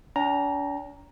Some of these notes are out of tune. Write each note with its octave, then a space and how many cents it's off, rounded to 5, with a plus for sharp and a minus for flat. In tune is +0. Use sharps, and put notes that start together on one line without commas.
D4 -45 G5 +0 A#5 +0